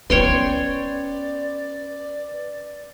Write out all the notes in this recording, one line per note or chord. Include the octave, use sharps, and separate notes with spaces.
B3 C#4 B4 C#5 D5 G5 C6